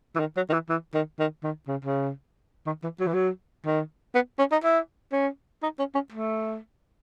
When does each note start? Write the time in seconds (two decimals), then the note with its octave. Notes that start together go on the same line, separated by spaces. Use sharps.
0.15 E3
0.20 D#3
0.36 F#3
0.49 D#3
0.53 E3
0.69 E3
0.94 D#3
1.19 D#3
1.44 D#3
1.67 C#3
1.85 C#3
2.66 D#3
2.83 E3
3.00 F#3
3.07 E3
3.13 F#3
3.65 D#3
4.15 B3
4.39 C#4
4.52 D#4
4.64 E4
5.12 C#4
5.63 D#4
5.79 C#4
5.95 C#4
6.12 A3